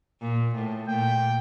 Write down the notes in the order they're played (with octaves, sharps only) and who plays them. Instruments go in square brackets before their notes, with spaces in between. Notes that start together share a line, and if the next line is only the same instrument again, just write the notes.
[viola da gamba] A#2
A2
[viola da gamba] A#2 [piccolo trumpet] G5